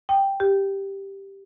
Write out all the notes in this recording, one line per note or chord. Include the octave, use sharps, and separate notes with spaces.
G5
G4